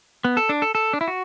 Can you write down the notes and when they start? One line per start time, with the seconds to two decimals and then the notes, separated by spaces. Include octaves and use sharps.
0.25 B3
0.37 A4
0.49 D4
0.62 A4
0.75 A4
0.93 D4
1.01 E4
1.08 F#4